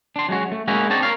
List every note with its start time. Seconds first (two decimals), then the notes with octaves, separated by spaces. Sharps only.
0.16 D4 C6
0.29 F#3 G#3 C#4 F#4
0.52 A3
0.68 G#3 A#3 C#4 D#4 E4 F#4
0.90 C4 D4 D#4 C#5 A5
1.03 A#4 B4 C#5 F5